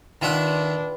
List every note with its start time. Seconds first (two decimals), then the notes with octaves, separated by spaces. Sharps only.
0.22 D#3 D4 F4 B4 E5 F#5 G5